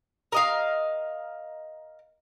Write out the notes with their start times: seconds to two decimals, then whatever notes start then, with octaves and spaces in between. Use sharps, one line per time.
0.32 A#4 D#5 F5